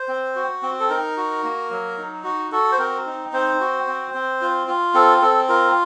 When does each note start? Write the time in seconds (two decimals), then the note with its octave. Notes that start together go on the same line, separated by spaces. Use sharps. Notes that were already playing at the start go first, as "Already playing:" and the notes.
Already playing: C5
0.08 C4
0.36 F#4
0.62 C4
0.80 A4
0.89 D#4 A#4
1.17 F#4
1.44 A#3
1.71 F#3
1.98 D#4
2.24 F#4
2.52 F#4 A4
2.72 C5
2.78 C4 A#4
3.06 D#4
3.33 C4 C5
3.60 F#4
3.87 C4
4.14 C4
4.41 F4
4.67 F4
4.94 C4 A4
5.22 C4 A4
5.49 F4 A#4